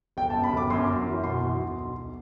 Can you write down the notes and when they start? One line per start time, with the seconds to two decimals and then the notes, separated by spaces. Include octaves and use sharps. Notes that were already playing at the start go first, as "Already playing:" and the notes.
0.17 G1 G5
0.30 A5
0.34 F#2
0.44 B5
0.53 G1 D6
0.70 F#2 C6
0.88 F#2
1.06 E3
1.24 B2 C6
1.42 B2
1.59 B1
1.77 B1
1.95 B1